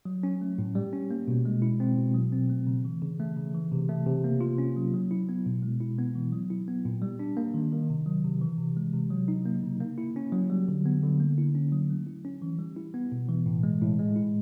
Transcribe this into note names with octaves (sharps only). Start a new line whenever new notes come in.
F#3
C#4
A3
A2
G3
C#4
A#3
B2
G#3
E4
C4
B2
F#3
C4
A3
C#3
E3
C#3
A3
C#3
E3
C3
A3
C3
A#3
F4
C#4
F#3
F#3
E4
B3
B2
G#3
E4
B3
E3
F#3
E4
B3
A#2
G3
D4
A#3
D#3
D#3
C3
F#3
C3
E3
C3
G#3
C3
F#3
D#4
A#3
C#3
A#3
E4
C#4
F#3
G3
D3
B3
D3
A#3
E4
C#4
F#3
A3
E4
C#4
E3
G3
E4
B3
B2
E3
A2
G#3
A2
G#3
E4